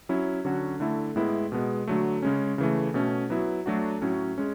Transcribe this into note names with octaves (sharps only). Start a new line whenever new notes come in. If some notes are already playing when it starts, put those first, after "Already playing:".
F#3 C#4 E4
D3 F#3 C#4 F#4
D3 A3 E4
A2 G#3 B3 E4
B2 G#3 B3
D3 F#3 A3
C#3 G#3 C#4
C#3 E3 A3
B2 A3 C#4
F#3 B3 E4
F#3 A3 D4 F#4
A2 F#3 C#4
G#3 C#4